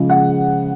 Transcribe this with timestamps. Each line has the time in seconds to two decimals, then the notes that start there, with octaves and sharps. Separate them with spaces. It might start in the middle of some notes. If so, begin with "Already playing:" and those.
Already playing: C#3 F3 G#3
0.10 F#5